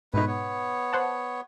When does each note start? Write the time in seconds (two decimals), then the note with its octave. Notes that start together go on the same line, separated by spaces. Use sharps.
0.14 G#2 B2 A3 D#4 E4 B4
0.27 B3 C#5
0.93 C5 F#5 A5